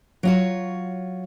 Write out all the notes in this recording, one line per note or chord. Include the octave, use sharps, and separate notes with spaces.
F#3 F4 C#5